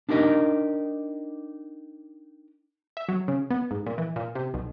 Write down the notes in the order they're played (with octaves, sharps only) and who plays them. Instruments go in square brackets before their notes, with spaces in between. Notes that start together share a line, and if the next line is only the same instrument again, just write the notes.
[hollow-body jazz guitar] D4 D#4 G4 A#4 D#5
[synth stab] E5
F#3
C#3
B3
G#2
A#2
E3
A#2
C3
B1